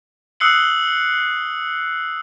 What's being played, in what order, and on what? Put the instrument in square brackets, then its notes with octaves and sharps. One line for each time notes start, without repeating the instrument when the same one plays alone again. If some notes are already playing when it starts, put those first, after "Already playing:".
[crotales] D#6 E6 F#6 C7 C#7 F#7